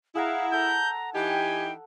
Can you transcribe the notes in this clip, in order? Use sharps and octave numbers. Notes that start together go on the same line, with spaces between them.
E4 G#4 F5 F#5 A#5
A4 A5 A#5 G6
E3 D#4 G4 G5 G#5